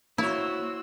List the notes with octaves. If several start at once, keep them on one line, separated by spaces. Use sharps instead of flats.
A#3 E4 F#4 C5 C#5 E6